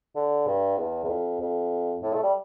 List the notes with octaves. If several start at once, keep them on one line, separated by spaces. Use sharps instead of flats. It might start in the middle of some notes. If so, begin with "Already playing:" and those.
D3
G2
E2
E2
F2
F2
A2
A3
G3